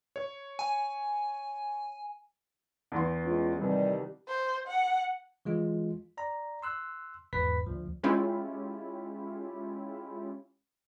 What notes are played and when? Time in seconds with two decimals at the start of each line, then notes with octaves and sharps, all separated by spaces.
0.16 C#5
0.59 G#5
2.92 E2 E3 C6
3.24 G#3 C#4 F4
3.57 C2 D#3 E3 G3
4.28 C5
4.68 F#5
5.45 E3 G#3 F4
6.17 D5 A#5
6.63 C6 E6 F#6
7.33 G#1 E2 G#2 B4 B6
7.66 D2 F3
8.03 G#3 C#4 E4 F4 G4